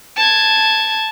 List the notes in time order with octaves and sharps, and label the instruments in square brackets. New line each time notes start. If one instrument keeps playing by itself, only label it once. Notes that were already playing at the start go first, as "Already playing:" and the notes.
[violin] A5 G#6